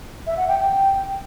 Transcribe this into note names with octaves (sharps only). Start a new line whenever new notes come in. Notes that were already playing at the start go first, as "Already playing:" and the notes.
E5
F#5
G5
G5